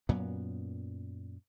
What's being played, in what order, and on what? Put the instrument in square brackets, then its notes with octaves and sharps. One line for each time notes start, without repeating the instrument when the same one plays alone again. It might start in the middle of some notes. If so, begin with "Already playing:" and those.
[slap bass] F#2 A#2 F#3 B3